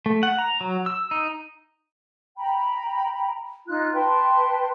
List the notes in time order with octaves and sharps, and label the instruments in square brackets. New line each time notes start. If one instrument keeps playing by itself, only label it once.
[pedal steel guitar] A3
F#5
A#5
F#3
E6
D#4
[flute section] G5 A#5 B5
D#4 F4 F#6
B4 G5 A5 C6